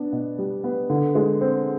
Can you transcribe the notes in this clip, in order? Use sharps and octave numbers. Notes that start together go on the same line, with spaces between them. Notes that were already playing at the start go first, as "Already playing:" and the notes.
Already playing: B3 D4
B2
G3
B3
D3
G#3
C4